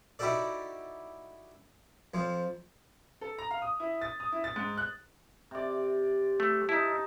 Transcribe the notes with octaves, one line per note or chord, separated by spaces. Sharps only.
D#4 E4 F#4 G4 A4 D5
F2 F3
A4
A#5
F5
D#6
E4
A6
D#6
E4
A6
G#2
F#6
C3 D5
A3
D#4 E4 A5